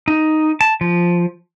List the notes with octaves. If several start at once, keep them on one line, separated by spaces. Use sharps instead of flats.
D#4
A5
F3